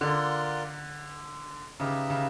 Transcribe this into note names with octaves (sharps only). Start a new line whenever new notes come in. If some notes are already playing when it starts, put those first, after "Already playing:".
D3 F4 A#4 D5 F#5
C#3 D#4 G4 B4 E5
C#3